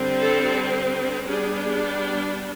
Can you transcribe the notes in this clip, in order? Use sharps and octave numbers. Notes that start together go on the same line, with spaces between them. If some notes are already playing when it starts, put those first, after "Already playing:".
Already playing: D3 G3 C4
A4
G3 B3 D4 G#4